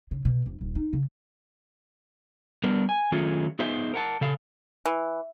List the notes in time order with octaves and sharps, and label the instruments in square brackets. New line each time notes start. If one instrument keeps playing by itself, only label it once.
[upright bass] C#3
B2
F1
D#1
D#4
C#3
[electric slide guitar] G3 B3 D4 A#4
G#5
D#3 F#3 A3 C#4 F4 G#4
B3 D#4 G#4 C5 E5 F5
A#4 F#5 A5
C#3 A4 F5
[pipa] E3